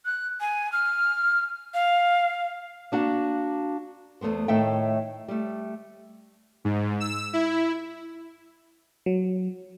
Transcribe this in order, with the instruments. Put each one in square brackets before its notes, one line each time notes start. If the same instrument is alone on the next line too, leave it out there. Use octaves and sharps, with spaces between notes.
[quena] F#6
G#5
F6
F5
[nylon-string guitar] A#3 D4 F#4 F#5 A5
E2 G#2 A3 B3 C5
A2 D#3 A3 E5 G5
G3 A3
[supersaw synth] G#2
E6
E4
[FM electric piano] F#3